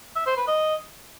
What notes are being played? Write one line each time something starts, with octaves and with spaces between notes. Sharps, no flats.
E5
C5
B4
D#5